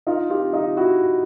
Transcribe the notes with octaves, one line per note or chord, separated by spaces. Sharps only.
D#4 F4
F4 G4
D#4 F4
E4 F#4